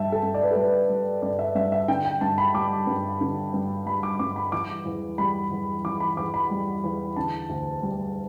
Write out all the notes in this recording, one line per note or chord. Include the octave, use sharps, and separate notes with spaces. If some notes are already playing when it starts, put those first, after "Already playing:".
Already playing: G2 G3 E5 G5 A5
A4
G2
D5
B4
A4
G3 B4
G3
G2 D5
E5
G2 E5
E5
D3 G5
G5
G2 A5
B5
G3 D6
G2
D3
G2
G3 B5
D6
G2 D6
B5
E3 D6
E2
G3 B5
E2
E3 D6
B5
E2 D6
B5
G3
E2
D3 A5
D2
G3